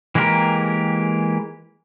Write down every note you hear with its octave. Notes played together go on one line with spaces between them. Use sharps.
E3 G#3 A#3 G4 A#4